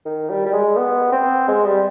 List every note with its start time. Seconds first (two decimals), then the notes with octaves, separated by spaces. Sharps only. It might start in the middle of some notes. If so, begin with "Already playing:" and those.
0.05 D#3
0.30 G3
0.46 G3
0.53 G#3
0.76 B3
1.12 C4
1.48 G#3
1.65 G3